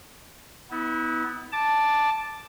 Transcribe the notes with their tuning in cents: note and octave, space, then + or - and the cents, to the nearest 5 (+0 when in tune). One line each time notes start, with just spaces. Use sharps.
B3 +10 E4 -35
A5 +0 D6 +5